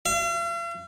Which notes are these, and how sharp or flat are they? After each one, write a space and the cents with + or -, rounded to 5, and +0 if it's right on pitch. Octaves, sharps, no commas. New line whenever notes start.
F5 -45